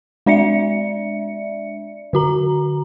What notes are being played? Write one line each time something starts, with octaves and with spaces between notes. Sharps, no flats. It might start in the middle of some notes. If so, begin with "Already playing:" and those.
G#3 D4 D5 E5 C#7
D3 F#4 A#5